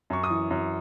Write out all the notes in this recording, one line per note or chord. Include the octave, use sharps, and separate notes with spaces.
F#2 C#6
D#6
E3
F#2